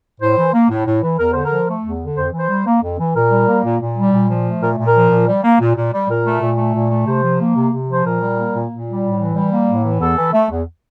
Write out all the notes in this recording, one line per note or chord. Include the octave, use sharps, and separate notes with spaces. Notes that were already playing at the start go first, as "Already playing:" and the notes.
A2 C5
E3
A#3
A2
A2
E3
E2 A#4
D3 C5
A#4
F3
A3
E2
D3
F2 C5
E3
C5
G3
A#3
F2
E3
A#2 A#4
G3
A#3
A#2
A#2
G3
A#2
F3
A3
A#2 A#4
A#2
A#4
F3
A#2
G3
A#3
A#2
A#2
G3
A#2 A#4
A3
A#2
A3
A#2
A3
C3 C5
F3
A#3
C3
C3
F3 C5
A#2 A#4
G3
A#3
A#2
A#2
G3
A2
E3
G3
A#3
A2
E3
E2 A4
E3
A3
E2